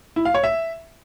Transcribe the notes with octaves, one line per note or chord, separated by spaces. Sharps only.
E4
F5
C#5
E5